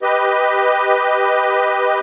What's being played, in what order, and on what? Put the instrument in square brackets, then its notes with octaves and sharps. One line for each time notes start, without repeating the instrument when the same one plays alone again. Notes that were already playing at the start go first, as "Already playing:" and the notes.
[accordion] G4 B4 D#5